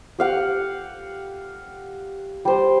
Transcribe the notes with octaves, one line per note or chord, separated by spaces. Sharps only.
G4 F5 F#5
G3 C5